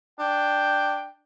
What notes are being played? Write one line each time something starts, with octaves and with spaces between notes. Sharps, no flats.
D4 G5